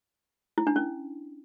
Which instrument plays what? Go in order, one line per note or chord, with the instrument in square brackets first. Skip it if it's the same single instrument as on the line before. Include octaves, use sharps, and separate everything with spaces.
[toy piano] E4
D4
C#4